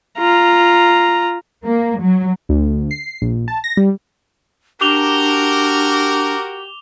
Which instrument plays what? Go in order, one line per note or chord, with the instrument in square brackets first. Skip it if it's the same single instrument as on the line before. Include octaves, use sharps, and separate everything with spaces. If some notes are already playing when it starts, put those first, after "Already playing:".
[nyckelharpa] F4 A#5
[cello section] A#3
F#3
[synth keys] D2
C7
A#1
A5
A#6
G3
[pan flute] D4 [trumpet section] F#4 A#4 [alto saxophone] G4 [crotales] D6 F7 G7